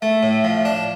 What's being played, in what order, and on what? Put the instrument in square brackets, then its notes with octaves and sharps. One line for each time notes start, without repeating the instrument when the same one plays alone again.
[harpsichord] A3 [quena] E5
[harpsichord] A2
F3
D4